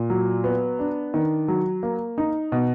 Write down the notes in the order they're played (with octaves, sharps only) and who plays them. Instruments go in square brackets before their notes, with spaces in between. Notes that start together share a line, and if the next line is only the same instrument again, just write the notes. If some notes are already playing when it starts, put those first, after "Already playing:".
Already playing: [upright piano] A#2
F#3
B3
D4
D#3
F#3
A#3
D#4
B2